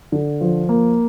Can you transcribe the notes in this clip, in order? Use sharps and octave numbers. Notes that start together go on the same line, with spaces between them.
D3
F3
A#3